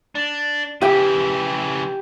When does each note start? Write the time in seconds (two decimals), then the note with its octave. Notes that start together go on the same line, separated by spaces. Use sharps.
0.15 D4
0.82 C#3 E3 G4 G5